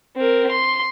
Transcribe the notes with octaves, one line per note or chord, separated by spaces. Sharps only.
C4 A#4
C6